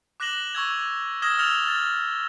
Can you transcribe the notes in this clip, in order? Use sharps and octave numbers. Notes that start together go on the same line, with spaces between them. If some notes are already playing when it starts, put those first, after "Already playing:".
D6 F#6 A#6 E7 F#7 G7
C#6 E6 G#6 F7
D#6 F6 G#6 A#6 E7 G7
E6 F6 A6 F7
A6